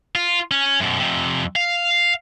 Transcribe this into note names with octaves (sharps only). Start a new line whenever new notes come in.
F4
C#4
F#2 B2
F2 C3
F5